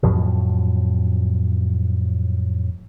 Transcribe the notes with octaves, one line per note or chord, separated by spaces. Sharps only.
F2 A2 F3 F#3